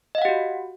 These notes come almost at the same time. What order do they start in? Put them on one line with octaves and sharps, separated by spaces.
D#5 F5 F#5 G4 F#4